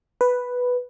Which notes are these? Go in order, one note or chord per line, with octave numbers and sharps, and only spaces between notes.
B4